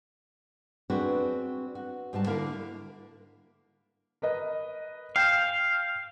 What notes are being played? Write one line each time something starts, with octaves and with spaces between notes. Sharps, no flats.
C4 D4 F#4 G#4 B4
F#4
G#2 G3 F4 F#4 A5
D3 A#3 E4 A#4 E5 F5
A#4 B4 D#5
F5 G5 G6 E7